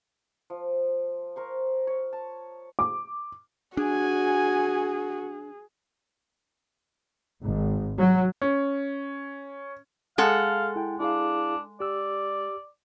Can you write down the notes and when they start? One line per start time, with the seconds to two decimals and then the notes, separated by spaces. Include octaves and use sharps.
0.50 F3
1.36 A#4 C5 C#6
1.87 C#5
2.13 A5
2.79 D6
3.77 D4 F#4 G#4 G#5
7.42 G#1
7.98 F#3
8.42 C#4
10.18 G#3 A4 F5 F#5
10.76 E4 G5
11.00 D4 E4 G#4 F5
11.80 G4 D5 E6